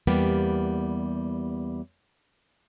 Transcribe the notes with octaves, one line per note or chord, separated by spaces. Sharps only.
E2 G3 A#3 B3 G4